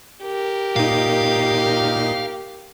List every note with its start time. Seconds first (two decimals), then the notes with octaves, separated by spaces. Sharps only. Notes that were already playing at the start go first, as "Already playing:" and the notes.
0.23 G4 A#4
0.76 A#2 D#4 F5